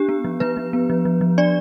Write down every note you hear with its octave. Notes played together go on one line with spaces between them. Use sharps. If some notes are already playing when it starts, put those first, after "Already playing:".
Already playing: D4 G4
B3
F3
F3 B4
F3
B3
F3
F3
F3
D4 D5